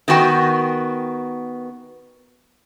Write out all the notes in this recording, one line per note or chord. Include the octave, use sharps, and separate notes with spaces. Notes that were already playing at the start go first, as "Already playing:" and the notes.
D#3 B3 F#4 G5